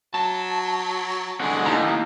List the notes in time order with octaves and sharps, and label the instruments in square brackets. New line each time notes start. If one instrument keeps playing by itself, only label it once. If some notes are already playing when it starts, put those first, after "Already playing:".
[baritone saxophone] F#3 [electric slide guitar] A5
[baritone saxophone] D3 [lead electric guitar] G#3 F#4 [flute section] G#5
[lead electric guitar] D#2 [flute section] D#4 G4 [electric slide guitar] E4 A5 A#5